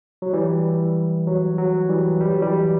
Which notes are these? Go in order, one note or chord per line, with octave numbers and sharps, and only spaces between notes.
F#3
E3 G3
F#3
F#3
E3 G3
G3
F#3
E3 G3